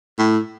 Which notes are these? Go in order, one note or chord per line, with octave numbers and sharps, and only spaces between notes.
A2